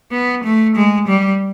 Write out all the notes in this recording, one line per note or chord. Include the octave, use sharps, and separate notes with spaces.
B3
A3
G#3
G3